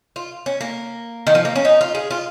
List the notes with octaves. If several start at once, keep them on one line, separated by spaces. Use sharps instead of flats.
F4
C#4
A#3
D#3
F3
A#3
C#4
D#4
F4
G#4
F4